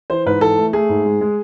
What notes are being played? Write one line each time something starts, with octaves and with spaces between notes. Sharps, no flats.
E3 C5
G#2 B4
E3 A4
A3
A3 G#4
G#2
G#3
G#3